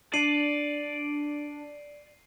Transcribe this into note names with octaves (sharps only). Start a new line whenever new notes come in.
D4 D5 C7 D#7 F#7